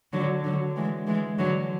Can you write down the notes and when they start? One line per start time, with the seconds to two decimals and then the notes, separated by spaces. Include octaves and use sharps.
0.13 D3 F#3
0.44 D3 F#3
0.76 E3 G#3
1.07 E3 G#3
1.38 D3 F#3